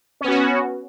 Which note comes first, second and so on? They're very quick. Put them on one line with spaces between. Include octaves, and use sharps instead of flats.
C#4 B3 F#4